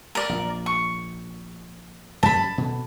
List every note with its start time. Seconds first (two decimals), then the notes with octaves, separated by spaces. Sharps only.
0.15 A#4 D5
0.29 A#1 A#2
0.66 C#6
2.23 F#2 G3 A5 B5
2.58 B2 D3